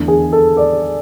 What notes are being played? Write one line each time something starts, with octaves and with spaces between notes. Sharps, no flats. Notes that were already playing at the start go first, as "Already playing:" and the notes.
Already playing: E2 D3 A3 D4
G#4
A4
D5